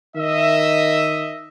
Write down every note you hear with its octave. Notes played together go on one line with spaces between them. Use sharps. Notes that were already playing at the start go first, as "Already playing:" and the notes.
D#3 D#5 E5